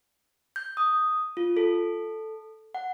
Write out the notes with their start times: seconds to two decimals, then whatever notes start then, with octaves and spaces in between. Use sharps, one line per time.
0.56 G6
0.77 D#6
1.37 F4
1.57 A4
2.75 F#5